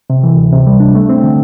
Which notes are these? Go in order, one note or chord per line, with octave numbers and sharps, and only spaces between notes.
C3
E3
D2
C3
G3
D4
A3
C4
D3